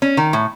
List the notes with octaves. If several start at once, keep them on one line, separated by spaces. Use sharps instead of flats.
C#4
D#3
A2